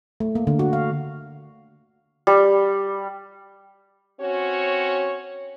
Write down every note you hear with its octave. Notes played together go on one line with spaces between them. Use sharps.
A3
A#3
D3
F#4
F5
G3
C4 C#4 F#4 C#5